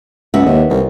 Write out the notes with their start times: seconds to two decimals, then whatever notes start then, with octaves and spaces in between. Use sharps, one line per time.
0.34 C#2 B3 F#4 E5
0.46 D#2
0.70 C2